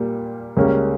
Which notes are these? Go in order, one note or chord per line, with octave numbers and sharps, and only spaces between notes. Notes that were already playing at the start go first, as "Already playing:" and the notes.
Already playing: A#2 G3 A#3
C#2 C#3 G3 A#3 C#4